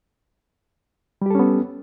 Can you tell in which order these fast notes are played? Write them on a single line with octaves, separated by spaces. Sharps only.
G3 G4 A4 C#4 B3